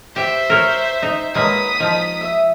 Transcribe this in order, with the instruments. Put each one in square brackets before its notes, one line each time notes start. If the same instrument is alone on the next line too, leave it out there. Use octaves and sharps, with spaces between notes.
[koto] G4 [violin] C5 E5
[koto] A#4 C#5
D#4
[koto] F#3 G#3 A#3 [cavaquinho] B4 A#5 [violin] D#6 B6
[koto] F3 [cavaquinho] D#4
[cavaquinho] E5